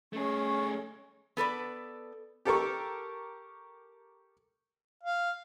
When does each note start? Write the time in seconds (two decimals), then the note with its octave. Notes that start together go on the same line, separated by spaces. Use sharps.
0.13 A3 C#4 G#4 C#6
1.37 B3 A4 B4 D5
2.45 G4 A4 A#4 C#6
5.03 F5